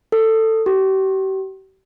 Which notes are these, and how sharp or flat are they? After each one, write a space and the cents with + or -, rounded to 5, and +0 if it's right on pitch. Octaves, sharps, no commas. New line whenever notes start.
A4 +15
G4 -40